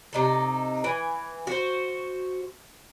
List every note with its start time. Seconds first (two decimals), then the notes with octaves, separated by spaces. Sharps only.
0.13 C3 D#4 A4
0.84 E3 G#5
1.47 F#4 C5